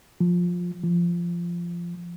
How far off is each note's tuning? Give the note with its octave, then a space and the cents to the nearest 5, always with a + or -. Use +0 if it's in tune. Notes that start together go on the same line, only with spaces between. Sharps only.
F3 +15
F3 -15